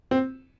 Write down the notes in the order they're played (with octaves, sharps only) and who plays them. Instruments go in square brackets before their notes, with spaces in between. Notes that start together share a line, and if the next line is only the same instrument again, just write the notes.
[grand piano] C4